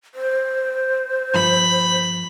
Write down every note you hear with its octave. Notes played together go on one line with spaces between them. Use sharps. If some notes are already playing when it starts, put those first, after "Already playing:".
C5
G2 F3 B5